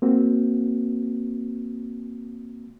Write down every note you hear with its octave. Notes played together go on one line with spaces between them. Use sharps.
A#3 C4 F#4